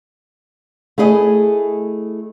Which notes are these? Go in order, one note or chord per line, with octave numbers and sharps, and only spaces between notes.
A3 E4 G#4 D#5